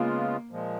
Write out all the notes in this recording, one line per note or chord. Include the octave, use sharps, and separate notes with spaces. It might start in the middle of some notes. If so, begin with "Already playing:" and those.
Already playing: C#3 G#3 A#3 B3 F4
A#2 F3 G#3